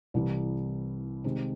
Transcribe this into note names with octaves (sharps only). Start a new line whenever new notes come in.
C2 C3 E3
C3 D#3 G#3 C4